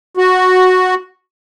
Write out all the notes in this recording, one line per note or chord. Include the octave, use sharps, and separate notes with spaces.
F#4